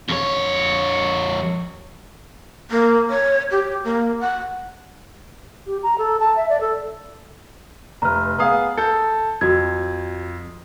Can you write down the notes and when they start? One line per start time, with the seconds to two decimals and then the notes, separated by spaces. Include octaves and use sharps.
0.09 F2 C#5
2.71 A#3
3.10 C#5
3.51 G4
3.85 A#3
4.20 F#5
5.67 G4
5.83 A#5
5.98 A4
6.20 A5
6.36 E5
6.49 D5
6.61 A4
8.02 F1 B4 A#5 F6
8.39 B3 G#4 F5 A#5 D#6
8.78 A4 G6
9.41 F2 F#4 G#6